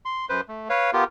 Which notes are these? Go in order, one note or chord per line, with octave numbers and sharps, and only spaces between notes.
C6
F#2 B4 C5
A3
B4 C#5 F5
B3 F4 G4 A#4